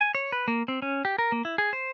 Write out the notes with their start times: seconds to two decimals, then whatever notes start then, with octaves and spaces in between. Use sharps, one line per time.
0.01 G#5
0.15 C#5
0.32 B4
0.48 A#3
0.68 C4
0.82 C#4
1.05 G4
1.19 A#4
1.32 A#3
1.45 E4
1.58 G#4
1.73 C5